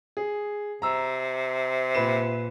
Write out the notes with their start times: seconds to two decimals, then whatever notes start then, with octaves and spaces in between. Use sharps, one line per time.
0.17 G#4
0.82 C3 A#5 E6
1.95 A#2 B4 E7